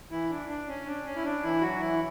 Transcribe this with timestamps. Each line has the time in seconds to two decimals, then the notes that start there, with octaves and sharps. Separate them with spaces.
0.11 E3 E4
0.30 D4
0.48 D4
0.68 C#4
0.86 D4
1.05 C#4
1.16 E4
1.25 D4
1.43 E3 E4
1.61 F#3 F#4
1.80 E3 E4